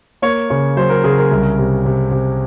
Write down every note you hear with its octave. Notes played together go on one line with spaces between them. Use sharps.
A#3 C#5
C#3 C#5
F#3 C5
A#4
C#3 G#4
A#4
C2
C3
C3
C3